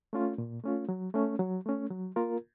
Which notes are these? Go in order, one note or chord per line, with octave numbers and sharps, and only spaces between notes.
A3 C#4 F4
A#2
A3 C#4 F4
F#3
A3 C#4
F#3
A3 C#4
F#3
A#3 F4 A#4